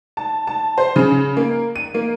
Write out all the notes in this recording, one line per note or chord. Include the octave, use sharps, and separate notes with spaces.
A5
A5
C5
C#3
A#3
D#7
A#3